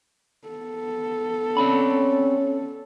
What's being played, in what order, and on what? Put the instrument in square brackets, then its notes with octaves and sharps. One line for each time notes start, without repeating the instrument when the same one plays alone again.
[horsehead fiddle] B3 A4
[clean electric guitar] C4 D5 B5 [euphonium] C#4